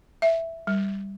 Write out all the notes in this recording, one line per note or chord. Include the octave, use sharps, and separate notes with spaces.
E5
G3